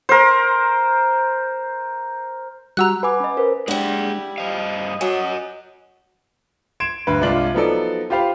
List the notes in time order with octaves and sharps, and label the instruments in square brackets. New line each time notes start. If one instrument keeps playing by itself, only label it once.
[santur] A#4 C5
[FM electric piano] G3 F#4 [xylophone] A#5 E6 F#6
[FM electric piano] B4 [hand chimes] F#5 G#5 D6
[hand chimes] C#4 D#5
A#4 C5
[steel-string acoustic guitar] G3 E4 [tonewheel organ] G#3 D4 [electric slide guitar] G#4 F#5
[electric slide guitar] G2 C5 F5 [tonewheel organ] D#5 D#6
[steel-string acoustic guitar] F#3 [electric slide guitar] F#4 G#5
[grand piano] C6 G#6 D7 E7
D2 G2 B4
C2 G#3 D4 F4 F#7
F3 F#3 B3 D#4 A4 D5
F4 G4 C5 F5 B5